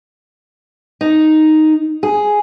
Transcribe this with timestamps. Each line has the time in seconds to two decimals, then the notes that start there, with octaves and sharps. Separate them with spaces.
1.01 D#4
2.03 G#4